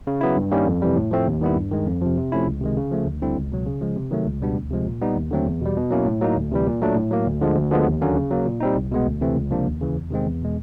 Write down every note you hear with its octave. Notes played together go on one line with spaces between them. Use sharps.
C#3
F#3 B3 E4
G2
D#3 G3 A#3 C#4
F2
C3 E3 G3
A2
F3 A3 C4
D#2
D#3 G3 B3 E4
G2
D#3 G#3
F2
C3 F3
C3
F3 A3 C#4 E4
C#2
C3 D#3 G#3
C#3
F3 A3
D2
D3 G3 C4 E4
C#2
B2 F#3
C#3
F3 G#3
C3
D#3 F#3 A3
C#2
B2 G3 B3 D4
D2
C3 F3 G#3
A#2
G3 B3 D#4
D#2
D3 F#3 A3 C4
E2
B2 G3
B2
F#3 A#3 C#4 E4
A2
F#3 A#3 D#4
D2
C3 E3 G3
A#2
F#3 A3 D4
A2
F#3 A#3
D2
D3 F3 G#3
D2
D3 F3 G#3 B3
D#2
D3 F#3 A#3 C#4
C#3
F#3 A#3
A#2
G3 C4 D#4
C2
B2 G#3 B3
D2
C3 E3 A3 C4
C#2
C3 F3 A#3 D4
D#2
C#3 E3
E2
C3 D#3 G#3 C4
E2
B2 G#3